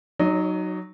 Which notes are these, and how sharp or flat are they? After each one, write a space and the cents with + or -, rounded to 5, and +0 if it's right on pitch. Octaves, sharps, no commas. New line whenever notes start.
F#3 +0 D#4 -10 C#5 +30